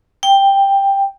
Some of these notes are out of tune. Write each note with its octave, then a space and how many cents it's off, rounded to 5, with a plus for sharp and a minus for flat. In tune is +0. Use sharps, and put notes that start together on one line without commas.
G5 +10